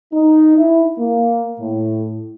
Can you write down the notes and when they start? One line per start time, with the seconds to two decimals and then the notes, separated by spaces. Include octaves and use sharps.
0.13 D#4
0.57 E4
0.99 A#3
1.60 A2